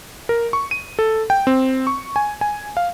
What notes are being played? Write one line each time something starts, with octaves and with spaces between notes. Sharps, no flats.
A#4
C#6
D#7
A4
G5
C4
C#6
G#5
G#5
F5